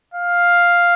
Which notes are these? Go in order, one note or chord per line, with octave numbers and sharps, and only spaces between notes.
F5